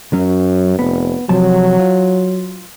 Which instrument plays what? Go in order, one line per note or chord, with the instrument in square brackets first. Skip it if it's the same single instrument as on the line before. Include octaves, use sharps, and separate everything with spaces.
[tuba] F#2 [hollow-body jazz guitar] F#3 C#4
[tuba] F1 [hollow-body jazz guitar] B3
[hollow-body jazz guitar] C3 F3 A5 [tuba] F#3
[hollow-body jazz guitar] F4